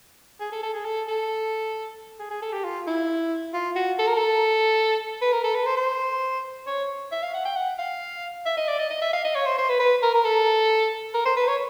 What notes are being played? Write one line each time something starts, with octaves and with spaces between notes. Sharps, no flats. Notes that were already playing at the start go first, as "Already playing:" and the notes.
G#4
A4
A4
G#4
A4
A4
G#4
G#4
A4
G4
F4
E4
F4
F#4
A4
A#4
A4
B4
A#4
A4
B4
C5
C5
C#5
E5
F5
F#5
G5
F#5
F5
E5
D#5
D5
D#5
D#5
E5
F5
D#5
C#5
C5
C5
B4
B4
A#4
A#4
A4
A#4
C5
B4
C#5